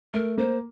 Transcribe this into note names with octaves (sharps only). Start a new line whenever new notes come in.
A3 A#4
A#3 C5